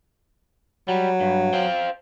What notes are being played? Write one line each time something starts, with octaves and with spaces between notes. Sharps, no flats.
F#3 G3
G2
C5 F5 G5